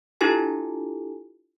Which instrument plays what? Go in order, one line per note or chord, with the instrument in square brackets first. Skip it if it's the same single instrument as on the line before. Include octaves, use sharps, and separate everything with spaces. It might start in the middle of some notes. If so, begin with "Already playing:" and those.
[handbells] D4 E4 F4 G4 A4 G#5